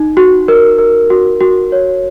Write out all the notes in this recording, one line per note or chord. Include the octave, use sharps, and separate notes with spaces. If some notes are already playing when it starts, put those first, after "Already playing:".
Already playing: D#4
F#4
A#4
A#4
F#4
F#4
C#5